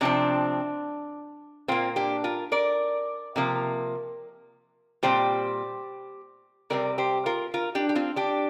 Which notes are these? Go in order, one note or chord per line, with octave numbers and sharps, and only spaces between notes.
C3 F3 C4 D4
A#2 A#3 C4 F4
D4 G4
F4 A#4
A#4 D5
C3 F3 A#3
A#2 G3 C4 G4 C5
C3 G3 C4 A#4 D5
G4 C5
F4 A#4
F4 A#4
D4 G4
G4
C4 F4
D4 G4